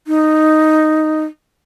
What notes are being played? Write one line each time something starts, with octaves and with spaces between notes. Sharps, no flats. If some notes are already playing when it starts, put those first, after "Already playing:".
D#4